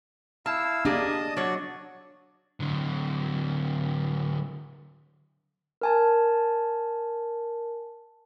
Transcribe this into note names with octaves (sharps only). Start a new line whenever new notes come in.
E4 F5 A5 E6
A#3 D4 G4 G#4 D#5 A5 D#6
F#3 F#4 C#5 D5
D3 F#3
A#4 G#5 A5